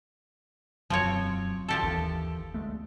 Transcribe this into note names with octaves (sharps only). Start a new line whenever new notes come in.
E1 F#2 F3 F#3 C4 C#5
F3 G4 A4
G1 D#2 E3
D2 G#3 A3